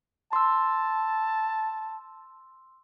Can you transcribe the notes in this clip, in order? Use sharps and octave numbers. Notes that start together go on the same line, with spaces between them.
A5 C6 E6